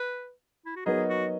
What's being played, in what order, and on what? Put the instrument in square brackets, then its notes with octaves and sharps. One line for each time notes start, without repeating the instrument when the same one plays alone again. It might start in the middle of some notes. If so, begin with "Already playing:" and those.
Already playing: [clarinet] B4
E4
F#4
[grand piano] F#3 B3 D#4 A#4 D#5 [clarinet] G#4
[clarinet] F#4